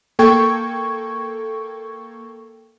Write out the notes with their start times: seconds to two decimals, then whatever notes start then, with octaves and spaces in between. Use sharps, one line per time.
0.19 A#3 A4 G5 C#6 G#6